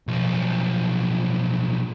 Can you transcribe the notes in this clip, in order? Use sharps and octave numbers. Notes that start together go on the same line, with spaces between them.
B1 F3